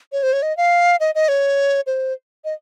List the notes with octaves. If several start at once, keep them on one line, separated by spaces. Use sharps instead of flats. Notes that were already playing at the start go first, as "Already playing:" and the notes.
C#5
C5
C#5
D#5
F5
D#5
D#5
C#5
C5
D#5